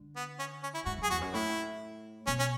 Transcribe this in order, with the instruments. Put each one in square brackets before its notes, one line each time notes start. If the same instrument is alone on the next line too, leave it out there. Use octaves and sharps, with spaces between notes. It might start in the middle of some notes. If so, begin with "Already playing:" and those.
Already playing: [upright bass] D3
[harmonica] B3
C#4
C#4
E4
[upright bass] G#2 [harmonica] F#4
[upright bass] F#2 [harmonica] G#4
[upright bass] E2 [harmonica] F#4
[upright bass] F#2
[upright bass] A2 [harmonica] E4
[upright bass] B2 [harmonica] C#4
[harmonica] C#4